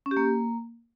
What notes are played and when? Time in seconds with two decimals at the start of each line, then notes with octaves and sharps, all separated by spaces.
0.06 C#4
0.11 G4
0.17 A#3